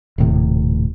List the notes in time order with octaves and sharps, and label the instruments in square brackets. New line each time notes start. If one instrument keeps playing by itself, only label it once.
[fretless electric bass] D#1 D#2 A2 C3